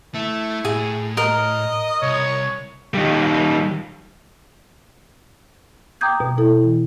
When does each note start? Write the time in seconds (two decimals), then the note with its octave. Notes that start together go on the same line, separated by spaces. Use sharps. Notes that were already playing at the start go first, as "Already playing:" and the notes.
0.14 A3 E4
0.65 A2 G#4
1.17 A#4 D#5
2.03 C2 C#5
2.94 D#3 G3
6.01 G5 A#5 D6 D#6 G6 G#6
6.20 B2
6.38 E4 A4
6.63 E3